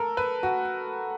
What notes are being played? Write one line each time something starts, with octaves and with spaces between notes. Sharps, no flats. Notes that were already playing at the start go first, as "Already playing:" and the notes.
Already playing: A4 A#4
B4
F#4